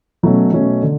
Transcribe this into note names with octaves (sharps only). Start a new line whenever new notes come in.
B2 F#3 A3 C#4
B2 F#3 A3 C#4
D3